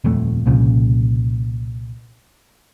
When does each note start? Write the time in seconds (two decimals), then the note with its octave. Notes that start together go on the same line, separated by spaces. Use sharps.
0.04 D#1 F2 A3
0.46 C2 A#2 C#3 F3